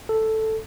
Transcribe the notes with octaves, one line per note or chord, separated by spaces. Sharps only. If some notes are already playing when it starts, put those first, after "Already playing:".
A4